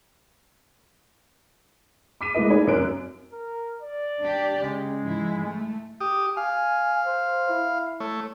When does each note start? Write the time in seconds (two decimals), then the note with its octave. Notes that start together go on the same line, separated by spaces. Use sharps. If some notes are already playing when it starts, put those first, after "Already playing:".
2.21 D6 B6 D#7
2.35 G#3 A#3 E4 B4 D#5
2.50 A3 D#4 C#5
2.67 F1 F#2 C#4 A#4 F#6 D7
3.33 A#4
3.81 D5
4.23 D4 G4
4.62 C#3 G#3
5.02 G#2 F3 E4
5.41 A3
6.01 G4 D#6
6.37 F5 G#5
7.06 C5
7.49 E4
8.00 A3 C#5